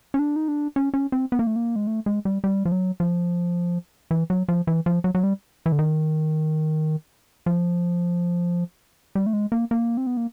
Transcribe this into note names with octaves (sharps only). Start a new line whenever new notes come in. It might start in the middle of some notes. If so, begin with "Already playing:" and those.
C#4
D4
D#4
D4
C#4
C#4
C4
B3
A#3
A3
A#3
G#3
A3
G#3
G3
G3
F3
F#3
F3
E3
F#3
F3
E3
F3
F#3
F#3
G3
E3
D3
D#3
F3
G3
A3
G#3
A#3
A#3
C4
B3
A#3